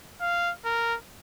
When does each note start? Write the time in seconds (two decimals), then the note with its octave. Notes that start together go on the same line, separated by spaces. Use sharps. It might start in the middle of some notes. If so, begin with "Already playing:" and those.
0.21 F5
0.65 A#4